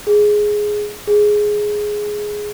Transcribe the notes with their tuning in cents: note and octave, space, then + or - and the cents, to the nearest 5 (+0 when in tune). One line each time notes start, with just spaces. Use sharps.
G#4 +5
G#4 +5